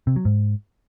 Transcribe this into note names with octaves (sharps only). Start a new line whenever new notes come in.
C3
F#3
G#2